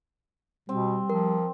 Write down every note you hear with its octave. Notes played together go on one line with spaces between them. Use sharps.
B2 G3 C4
F3 A#4